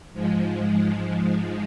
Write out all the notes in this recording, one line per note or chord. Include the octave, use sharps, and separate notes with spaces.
G#2 F3 G#3